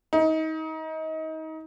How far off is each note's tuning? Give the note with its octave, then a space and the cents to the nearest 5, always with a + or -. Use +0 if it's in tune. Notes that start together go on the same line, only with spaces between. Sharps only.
D#4 +30